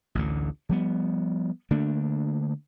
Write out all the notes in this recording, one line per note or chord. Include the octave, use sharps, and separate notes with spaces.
A1 D2 D3
F3 G3 B3
D3 A3 A#3 D4